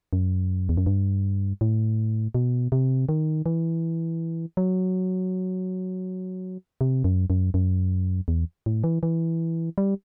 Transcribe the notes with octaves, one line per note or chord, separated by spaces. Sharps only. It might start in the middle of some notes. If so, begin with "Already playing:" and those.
F#2
E2
F#2
G2
A2
B2
C3
D#3
E3
F#3
C3
F#2
F#2
F#2
E2
A2
E3
E3
G3